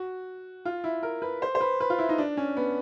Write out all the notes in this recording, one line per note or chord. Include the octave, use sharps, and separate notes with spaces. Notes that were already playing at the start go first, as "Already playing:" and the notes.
Already playing: F#4
F4
E4
A#4
B4
C5
C5
B4
B4
F4
E4
D#4
D4
C#4
B3